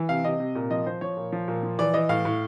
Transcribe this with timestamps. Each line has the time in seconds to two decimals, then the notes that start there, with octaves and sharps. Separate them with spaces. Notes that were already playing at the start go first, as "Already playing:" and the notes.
Already playing: E3
0.09 C3 F5
0.24 C3 D#5
0.40 C3
0.55 A#2
0.71 F3 D#5
0.86 F3 C5
1.01 F3 C#5
1.17 A#2
1.32 F3
1.48 A#2
1.63 F3
1.79 E3 D5
1.94 E3 D#5
2.09 A2 F5
2.25 A2